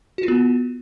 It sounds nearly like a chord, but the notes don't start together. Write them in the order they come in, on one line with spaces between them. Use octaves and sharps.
F#4 F4 B3